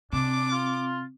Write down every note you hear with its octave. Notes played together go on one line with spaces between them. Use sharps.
C3 C4 D4 D6
F4